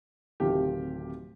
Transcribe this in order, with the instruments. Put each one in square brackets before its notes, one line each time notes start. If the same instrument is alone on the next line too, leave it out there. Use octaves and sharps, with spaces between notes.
[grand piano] D1 C3 D#3 F3 G4